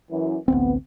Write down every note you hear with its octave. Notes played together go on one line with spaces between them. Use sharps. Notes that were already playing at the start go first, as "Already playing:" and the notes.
F#2 E3
A1 D2 B3 C4